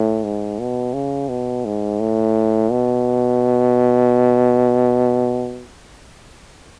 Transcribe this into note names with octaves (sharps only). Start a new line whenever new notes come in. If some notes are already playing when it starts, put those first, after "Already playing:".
Already playing: A2
G#2
B2
C#3
B2
G#2
A2
B2